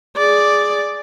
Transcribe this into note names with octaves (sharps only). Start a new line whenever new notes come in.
G#4 D5